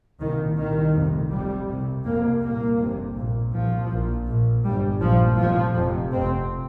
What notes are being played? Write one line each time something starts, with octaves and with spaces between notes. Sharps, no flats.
C2 A#2 D#3
C2 A#2 D#3
F1 F2 C3
F1 F2 C3 G3
C2 C3
F1 F2 C3 A#3
C2 A#2 A#3
G1 F2 C3
A#1 A#2
C2 A#2 F3
A#1 A#2
A#1 A#2
G1 G2 G3
A#1 A#2 F3
F1 F2 C3 F3
F1 F2 C3
F1 F2 C3 C4